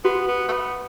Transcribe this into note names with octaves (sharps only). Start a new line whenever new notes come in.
B3 F#4
B3
A3
B3